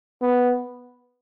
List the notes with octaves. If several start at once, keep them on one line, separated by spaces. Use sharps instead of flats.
B3